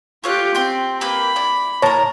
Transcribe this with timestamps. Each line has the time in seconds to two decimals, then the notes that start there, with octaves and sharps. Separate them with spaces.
0.24 A3 F4 G4 C#5 F#6
0.55 C4 G5 C6
1.01 A#3 G4 B4 B5
1.36 E4 D5
1.82 A#4 C#5 A5 A#5